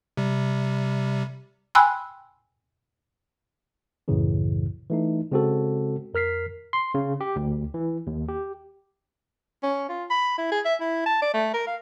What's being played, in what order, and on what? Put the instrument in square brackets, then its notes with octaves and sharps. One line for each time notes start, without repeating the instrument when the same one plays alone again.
[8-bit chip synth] C3 G3
[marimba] G5 G#5 B5 C6 E6 F#6
[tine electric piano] C2 F#2 A2 C#3 E3
E3 A3 D#4
C#3 G#3 C4 F#4 A4
F2 A#4 F6 B6 C7
C6
C#3
G4
D2
E3
D#2
G4
[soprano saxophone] C#4
F4
B5
E4
G#4
E5
E4
A5
D5
A3
A#4
F5